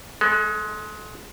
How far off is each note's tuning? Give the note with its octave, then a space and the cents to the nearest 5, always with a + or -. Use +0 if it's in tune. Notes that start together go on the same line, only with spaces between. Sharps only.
G#3 +20 A4 -20